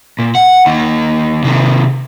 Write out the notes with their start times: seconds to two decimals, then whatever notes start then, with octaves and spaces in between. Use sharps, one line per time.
0.19 A#2
0.35 F#5
0.66 D#2 D#3
1.44 C3 D#3